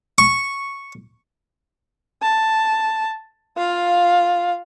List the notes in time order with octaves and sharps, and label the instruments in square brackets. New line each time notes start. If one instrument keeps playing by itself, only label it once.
[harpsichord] C#6
[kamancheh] A5
F4 F5